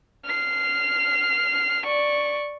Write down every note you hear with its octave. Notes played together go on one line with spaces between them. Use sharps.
F6 C7
D5 C#6